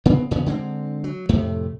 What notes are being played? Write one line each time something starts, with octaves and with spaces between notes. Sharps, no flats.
C#3 B3 C4
E2 C#3 B3
D3 G#3 A#3 C4
F#3
F2 A2 C3 A3